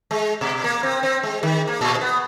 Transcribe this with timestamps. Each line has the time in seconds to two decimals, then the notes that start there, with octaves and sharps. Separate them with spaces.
0.11 G#3
0.41 B2
0.64 A#3
0.83 C4
1.03 C4
1.23 G#3
1.43 D#3
1.68 A#3
1.81 A#2
2.01 B3